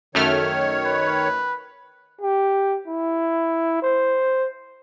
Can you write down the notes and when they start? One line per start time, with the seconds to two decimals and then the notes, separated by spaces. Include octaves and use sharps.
0.15 F#2 D#3 A3 C#5 F6
0.85 B4
2.21 G4
2.87 E4
3.82 C5